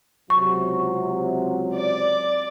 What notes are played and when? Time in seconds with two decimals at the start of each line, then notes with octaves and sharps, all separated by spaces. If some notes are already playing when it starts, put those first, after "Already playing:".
0.30 C#2 C3 F#3 C#6
1.77 D5